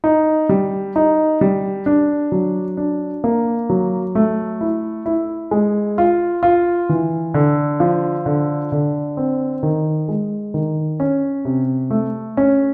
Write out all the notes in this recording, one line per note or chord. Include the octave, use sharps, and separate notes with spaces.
D#4
G3
D#4
G3
D4
F#3
D4
A#3
F#3
A3
E4
E4
G#3
F4
F4
E3
D3
F3
D3
D3
C4
D#3
G#3
D#3
C#4
C3
A3
C#4